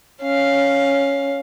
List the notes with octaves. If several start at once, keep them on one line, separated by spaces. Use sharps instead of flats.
C#4 F5